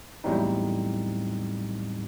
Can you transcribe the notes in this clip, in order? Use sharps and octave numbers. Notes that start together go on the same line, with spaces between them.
E2 A2 F#3 G3 C4 D#4